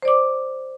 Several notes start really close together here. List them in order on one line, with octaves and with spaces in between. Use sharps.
C5 D5 D6